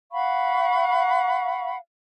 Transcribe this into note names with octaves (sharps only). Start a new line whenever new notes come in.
F5 F#5 B5 C#6